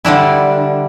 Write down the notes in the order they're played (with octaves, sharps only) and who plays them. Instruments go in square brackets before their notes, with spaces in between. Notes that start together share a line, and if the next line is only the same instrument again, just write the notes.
[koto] D3 G3 D4 E4